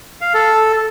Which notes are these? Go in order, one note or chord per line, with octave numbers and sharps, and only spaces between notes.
F5
A4